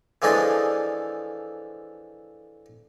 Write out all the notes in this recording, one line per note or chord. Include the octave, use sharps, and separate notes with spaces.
E3 F3 A3 D4 G#4 D#5